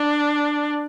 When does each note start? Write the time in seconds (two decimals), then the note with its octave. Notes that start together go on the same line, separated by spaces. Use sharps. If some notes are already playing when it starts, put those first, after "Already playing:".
Already playing: D4